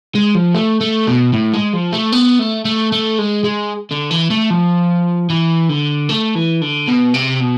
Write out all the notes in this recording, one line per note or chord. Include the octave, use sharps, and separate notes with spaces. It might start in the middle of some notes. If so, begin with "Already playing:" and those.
G#3
F3
A3
A3
B2
A2
G#3
F3
A3
B3
A3
A3
A3
G#3
G#3
D3
E3
A3
F3
E3
D3
A3
E3
D3
B2
C3
B2